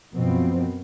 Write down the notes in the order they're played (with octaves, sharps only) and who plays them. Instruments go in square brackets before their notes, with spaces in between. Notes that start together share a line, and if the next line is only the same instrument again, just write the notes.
[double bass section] F#2 B2 C4 [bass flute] F3